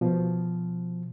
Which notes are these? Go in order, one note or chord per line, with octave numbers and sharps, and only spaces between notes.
B2 F3